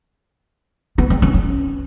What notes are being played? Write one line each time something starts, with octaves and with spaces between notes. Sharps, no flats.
B3
C4
C#4
C#4